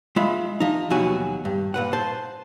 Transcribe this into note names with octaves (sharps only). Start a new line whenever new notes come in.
G#3 F4 E5 B5
F3 D#4
D#2 B2 F#3 F#4 G#5
G2
A#2 B4 F#5
C5 A5